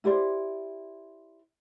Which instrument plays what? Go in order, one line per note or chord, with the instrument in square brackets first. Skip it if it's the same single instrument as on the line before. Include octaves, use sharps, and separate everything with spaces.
[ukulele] E4 G4 C5 D5